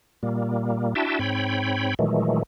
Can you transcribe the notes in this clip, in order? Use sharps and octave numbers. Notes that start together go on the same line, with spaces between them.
A#2 G3 A#3
D4 E4 F#4 E5 G5 A5
G#2 C4 C#5 G5 B5
A#2 D#3 E3 F#3 G#3 A3